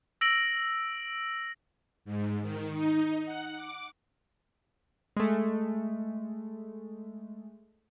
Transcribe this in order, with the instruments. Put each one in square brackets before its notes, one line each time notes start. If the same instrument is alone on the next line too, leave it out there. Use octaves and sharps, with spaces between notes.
[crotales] E6 A#6 D7 F#7
[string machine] G#2
D#3
D#4
F#5
D6
[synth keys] G#3 A3